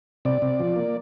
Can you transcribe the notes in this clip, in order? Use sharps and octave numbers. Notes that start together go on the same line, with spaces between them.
C3 D5
C3
F3
A#3